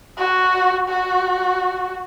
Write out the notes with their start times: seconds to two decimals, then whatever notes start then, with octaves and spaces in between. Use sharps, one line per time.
0.18 F#4
0.89 F#4